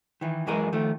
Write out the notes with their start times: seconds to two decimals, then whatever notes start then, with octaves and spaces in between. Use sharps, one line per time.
0.21 D#3 E3
0.47 F#2 E3 G#3 G#4 A#4
0.73 D#3 F3 A3